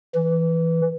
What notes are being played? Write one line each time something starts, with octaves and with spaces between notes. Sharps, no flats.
E3